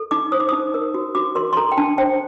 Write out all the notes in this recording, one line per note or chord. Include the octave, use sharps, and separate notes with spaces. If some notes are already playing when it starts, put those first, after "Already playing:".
Already playing: A4
D#4 D6
C5 D#6
D6
D#4 D#6
A#4
F#4
F#4 D6
A#4 C6
C6
A4 A#5
G5
D4 A5
C5 G5